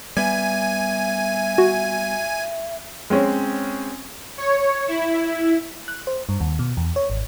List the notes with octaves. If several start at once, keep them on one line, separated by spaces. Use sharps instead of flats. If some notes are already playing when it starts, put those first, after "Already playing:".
G3 B3 E5 G#5
F#4
G#3 C4 C#4
C#5
E4
F#6
C5
G2
D#2
B2
E2
C#5
G#1